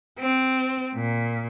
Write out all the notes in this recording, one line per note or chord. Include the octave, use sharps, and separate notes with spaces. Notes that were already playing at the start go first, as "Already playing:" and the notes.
C4
A#2